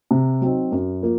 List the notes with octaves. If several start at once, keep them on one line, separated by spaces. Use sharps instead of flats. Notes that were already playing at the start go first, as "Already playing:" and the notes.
C3
F#3 C4 D#4
F#2
F3 A#3